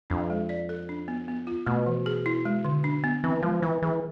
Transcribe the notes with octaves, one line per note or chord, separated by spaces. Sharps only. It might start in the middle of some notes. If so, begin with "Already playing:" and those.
F2 D4
G#3
D5
A4
D4
B3
B3
F4
B2 A3
E3
G#4
E4
G#3
D3
D4
B3
E3 C4
F3 G#3
E3 B4
E3 G#4